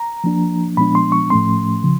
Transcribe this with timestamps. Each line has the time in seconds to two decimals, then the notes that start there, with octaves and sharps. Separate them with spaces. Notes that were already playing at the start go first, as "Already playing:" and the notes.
Already playing: A#5
0.24 F3 A#3 D4
0.77 A#2 F3 G#3 B3 D4 B5
0.95 C6
1.12 C#6
1.30 A2 F3 A3 C#4 C6
1.83 C#3 F3